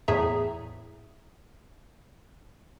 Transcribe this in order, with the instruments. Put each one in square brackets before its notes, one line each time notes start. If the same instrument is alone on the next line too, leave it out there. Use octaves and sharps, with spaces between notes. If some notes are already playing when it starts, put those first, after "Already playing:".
[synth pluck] E2 A2 G#4 E5 A#5